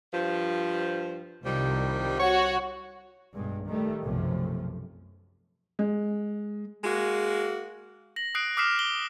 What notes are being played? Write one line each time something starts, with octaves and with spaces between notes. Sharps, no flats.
G2 F3
C2 D#3 F3 G3
F#4 C#5
B1 G2 G#3
D#3 G3 A3
B1 F#2 C3 F3 A3
G#3
G#3 A#3 F#4
A#6 F#7
D#6 F#6 C7 D7
D6 D#6 F6 B6 C7 E7
G7